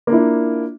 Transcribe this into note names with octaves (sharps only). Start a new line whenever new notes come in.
A#3 D4 E4 F4